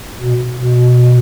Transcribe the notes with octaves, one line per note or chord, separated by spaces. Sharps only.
B2
B2